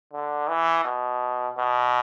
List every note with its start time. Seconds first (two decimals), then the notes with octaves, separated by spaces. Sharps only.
0.13 D3
0.49 E3
0.85 B2
1.58 B2